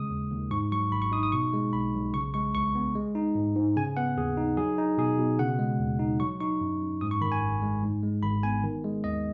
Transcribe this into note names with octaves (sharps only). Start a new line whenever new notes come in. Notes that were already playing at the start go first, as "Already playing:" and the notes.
Already playing: C#3 G#3 D#6
D#2
D#2
G#2 C#6
F#3 C#6
G#1 B5
C#6
D#4 D#6
D#6
B2 C#6
G#3
B1 B5
B1
C#3 C#6
G#3 C#6
C#2 C#6
B3
G#3
D#4
G#2
G#2
C#3 G#5
B3 F#5
D#2 G#4
D#4
F#3 G#4
D#4
B2 G#4
B2
C#3 F#5
G#3
D#2
D#4
F#3 C#6
D#4 C#6
F#2
F#2
G#2 D#6
C#6
D#3 B5
G#5
G#1
G#3
G#2
G#3
G#1 B5
B3 G#5
D#3
G#3
D#2 D#5